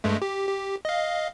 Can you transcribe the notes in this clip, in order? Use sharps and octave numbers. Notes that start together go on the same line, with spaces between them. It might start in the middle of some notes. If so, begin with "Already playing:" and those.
G2 G#3 A3
G4
G4
D#5 F5